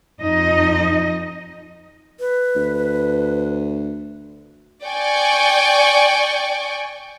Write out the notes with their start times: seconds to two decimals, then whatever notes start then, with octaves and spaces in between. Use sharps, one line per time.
0.21 F2 D#4 D#5
2.20 B4
2.56 D2
4.84 D5 G5 G#5 C#6